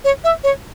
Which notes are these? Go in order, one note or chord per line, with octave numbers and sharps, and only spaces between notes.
C#5
E5
C#5